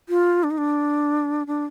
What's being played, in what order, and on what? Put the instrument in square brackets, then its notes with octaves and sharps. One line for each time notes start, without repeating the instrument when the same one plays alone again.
[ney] F4
D4
D#4
D4
D4